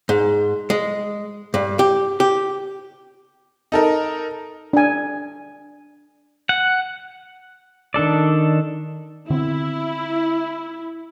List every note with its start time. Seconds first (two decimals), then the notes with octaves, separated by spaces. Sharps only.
0.09 G#2
0.70 G#3
1.54 G2
1.79 G4
2.20 G4
3.72 D#4 A4 A#4
4.73 D4 G#5
6.49 F#5
7.94 D#3 D4 A4 D5
9.30 D3 B3 C4 E4